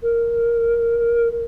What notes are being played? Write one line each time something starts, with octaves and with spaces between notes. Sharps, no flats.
A#4